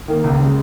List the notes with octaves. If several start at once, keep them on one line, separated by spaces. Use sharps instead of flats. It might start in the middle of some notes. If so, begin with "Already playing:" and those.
D#3 A#3
C#2
C#3 G#3